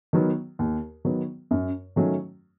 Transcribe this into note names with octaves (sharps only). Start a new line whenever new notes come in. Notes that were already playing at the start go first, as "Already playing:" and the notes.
D#3 F#3 B3
D#2
D#3 F#3 B3
F#2
D#3 F#3 A3 C#4